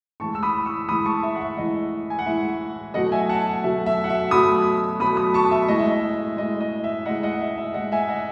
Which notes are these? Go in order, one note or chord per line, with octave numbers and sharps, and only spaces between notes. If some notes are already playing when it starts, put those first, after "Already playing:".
A2 E3 G#3 A5 C#6
E6
B5 D#6
C#6 E6
A2 E3 G#3 B5 D#6
A5 C#6
E5
F#5
E5
A2 E3 G#3 D#5
G#5
F#5
A2 E3 G#3 E5
B2 F#3 A3 D#5 F#5
E5 G#5
F#5 A5
B2 F#3 A3 E5
E5
F#5
E5
B2 F#3 A3 B5 D#6
B2 F#3 A3 B5 D#6
B5 D#6
A5 C#6
E5
A2 G#3 D#5
E5
D#5
E5
A2 G#3 D#5
D#5
E5
A2 G#3 D#5 F#5
D#5 F#5
F#5
E5
E5
A2 G#3 D#5 F#5
E5 G#5
D#5 F#5